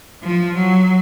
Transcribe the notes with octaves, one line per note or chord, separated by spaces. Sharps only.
F3
F#3